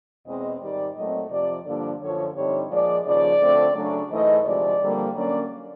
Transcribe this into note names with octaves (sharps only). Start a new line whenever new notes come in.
E2 B2 G#3 C4 D#5
G#2 D#3 G3 D5
A#2 F#3 A3 C4 D#5
F2 C3 F3 D5
G2 D3 F3 A#3 D4 D5
F#2 D3 F3 C#5
G2 D3 G3 C4 D#4 C#5
A#2 F3 G#3 D5
D#2 C#3 F3 D5
D3 F3 A3 C4
C#3 F#3 A3 D4
G#2 E3 A3 D#5
D2 C3 F3 G#3 D5
F2 D3 G3 A#3
D3 F#3 A#3 C#4 D5